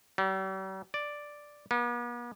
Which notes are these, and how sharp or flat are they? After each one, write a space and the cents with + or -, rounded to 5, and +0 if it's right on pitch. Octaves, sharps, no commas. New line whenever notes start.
G3 -45
D5 +0
B3 -45